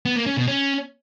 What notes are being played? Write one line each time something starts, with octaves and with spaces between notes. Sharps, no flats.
B3
A#3
C#4
B2
C#4